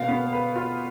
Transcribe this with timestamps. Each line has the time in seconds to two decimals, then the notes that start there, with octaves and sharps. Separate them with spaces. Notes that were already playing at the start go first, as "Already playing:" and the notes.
Already playing: B2 F5
0.08 B3
0.33 B4
0.56 F4